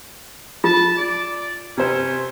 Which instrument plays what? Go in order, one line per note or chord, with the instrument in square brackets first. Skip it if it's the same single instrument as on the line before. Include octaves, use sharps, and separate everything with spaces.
[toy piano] F4 [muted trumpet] A5
[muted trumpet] D5
[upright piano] C3 C5 [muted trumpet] C#4